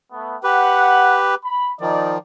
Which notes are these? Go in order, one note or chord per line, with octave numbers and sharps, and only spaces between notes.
A3 B3
G4 B4 F#5
B5
D#3 F3 D#4 D5